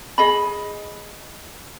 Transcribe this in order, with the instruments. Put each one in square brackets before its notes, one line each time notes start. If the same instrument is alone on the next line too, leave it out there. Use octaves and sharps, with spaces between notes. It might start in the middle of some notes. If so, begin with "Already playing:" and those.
[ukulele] G#4 D#5 B5